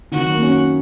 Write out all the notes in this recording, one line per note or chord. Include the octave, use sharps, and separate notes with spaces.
D#3 F#4
F#3
A#3
C#4